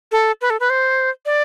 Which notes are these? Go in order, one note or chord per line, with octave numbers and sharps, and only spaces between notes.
A4
B4
A4
B4
C5
D5